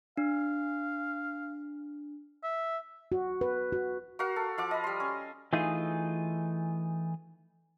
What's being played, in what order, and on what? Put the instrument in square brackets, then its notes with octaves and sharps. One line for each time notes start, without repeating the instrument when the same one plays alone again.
[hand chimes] D4 [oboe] F5
[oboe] E5
[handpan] F#4
B4
F#4
[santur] F#4 A#4 F5
A4
F3 F5 D6
D#5 B5
G3 C6
C#4
[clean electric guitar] E3 A3 D#4 F4 G#4